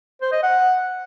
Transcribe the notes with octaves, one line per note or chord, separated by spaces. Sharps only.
C5
D#5
F#5